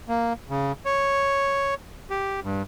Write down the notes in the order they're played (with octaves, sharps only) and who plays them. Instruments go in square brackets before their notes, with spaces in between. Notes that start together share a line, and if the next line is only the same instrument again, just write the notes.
[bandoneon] A#3
C#3
C#5
G4
G2